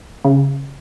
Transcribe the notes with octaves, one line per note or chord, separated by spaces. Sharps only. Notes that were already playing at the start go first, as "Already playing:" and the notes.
C#3